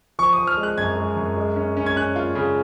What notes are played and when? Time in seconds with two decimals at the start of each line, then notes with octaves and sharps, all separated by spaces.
0.19 F3 C#6
0.33 D#6
0.38 F3
0.47 F6
0.57 G#3
0.63 F#6
0.77 F#2 G#6
0.97 G#3
1.17 F#2
1.37 G#3
1.56 C#4
1.77 C#4
1.86 G#6
1.96 C#4 F#6
2.16 F4
2.35 C#3